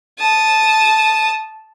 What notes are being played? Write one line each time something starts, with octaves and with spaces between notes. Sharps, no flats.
A5 D#6